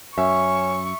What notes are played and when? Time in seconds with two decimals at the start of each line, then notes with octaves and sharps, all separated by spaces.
0.18 F#2 C#4 E5 C#6